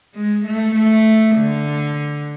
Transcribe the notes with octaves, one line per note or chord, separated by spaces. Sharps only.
G#3
A3
A3
D3